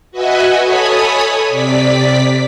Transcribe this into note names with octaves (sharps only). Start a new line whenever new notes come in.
F#4 B4 D#5 E5 F#5 G#5
A4 C#5 G#5 B5 D#6
C3 D5 B6